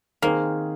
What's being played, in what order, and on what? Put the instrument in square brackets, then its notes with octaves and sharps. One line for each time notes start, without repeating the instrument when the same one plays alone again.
[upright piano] D#3 C4 G#4 C5 [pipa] A#3